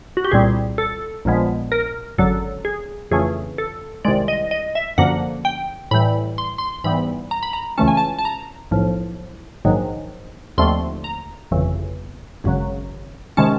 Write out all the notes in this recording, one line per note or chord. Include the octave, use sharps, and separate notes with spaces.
F#4
G4
C2 A#2 G3 C4 G#4
A4
A#1 A#2 F3 G#3 B3
A#4
G#1 F#2 D3 F#3 A4
G#4
F2 C#3 E3 A3 C#4 G#4
A4
C2 C3 D#3 G#3 D5
D#5
D#5
E5
F#2 D3 F3 A#3 F#5
G5
A2 E3 G3 B5
C6
C6
G#2 E3 G3 B3 B5
A#5
B5
A#5
C#2 C#3 E3 A3 C#4 A5
G#5
A5
A5
A#5
B1 A2 F3
A#1 G#2 D#3 F#3
D#2 D3 F3 A3 C4 C6
A#5
G1 F2 C#3 E3
G#1 F#2 C#3 F#3
C3 D#3 G#3 C#4 A5